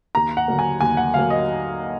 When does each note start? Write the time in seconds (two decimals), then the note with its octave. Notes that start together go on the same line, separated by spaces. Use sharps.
0.15 D#2 A#5
0.37 F#5
0.48 D3 F#3 A#3
0.59 G#5
0.81 D#2 G#5
0.97 F#5
1.14 D3 F#3 A#3 F5
1.30 D#5